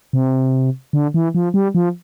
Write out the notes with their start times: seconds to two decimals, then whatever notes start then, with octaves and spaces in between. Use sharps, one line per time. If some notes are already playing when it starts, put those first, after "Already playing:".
0.13 C3
0.93 D3
1.14 E3
1.35 F3
1.54 G3
1.75 F3